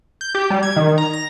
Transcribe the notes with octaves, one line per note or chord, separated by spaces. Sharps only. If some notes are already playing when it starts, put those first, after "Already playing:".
G6
G4
G3
G#6
D#3
A#5
A#6